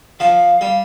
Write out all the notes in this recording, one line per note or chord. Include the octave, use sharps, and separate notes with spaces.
F3 F5
G3